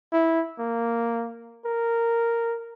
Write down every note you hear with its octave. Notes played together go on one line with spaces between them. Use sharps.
E4
A#3
A#4